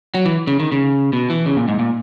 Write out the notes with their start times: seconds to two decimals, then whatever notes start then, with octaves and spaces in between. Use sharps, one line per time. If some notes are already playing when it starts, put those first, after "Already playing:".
0.14 F#3
0.25 E3
0.47 C#3
0.60 D#3
0.72 C#3
1.13 B2
1.30 E3
1.46 C#3
1.57 A#2
1.68 G#2
1.79 A#2